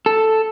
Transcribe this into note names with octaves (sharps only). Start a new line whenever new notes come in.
A4